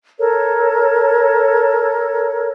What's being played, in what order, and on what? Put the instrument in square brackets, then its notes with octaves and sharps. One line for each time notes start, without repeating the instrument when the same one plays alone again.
[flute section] A4 A#4 C#5